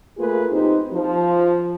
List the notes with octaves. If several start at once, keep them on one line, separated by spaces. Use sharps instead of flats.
A3 A#3 F4 G#4 B4
C3 C4 D#4 G4 C5
F3